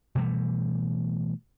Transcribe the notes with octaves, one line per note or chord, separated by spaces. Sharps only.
B2 E3 G3 A3